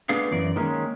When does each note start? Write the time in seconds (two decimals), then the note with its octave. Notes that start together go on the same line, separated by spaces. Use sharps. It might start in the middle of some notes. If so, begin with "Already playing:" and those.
0.09 A3 B3 D4 G#4 F5
0.31 F#2 E3 D5
0.56 D#3 G#3 A#3 C#4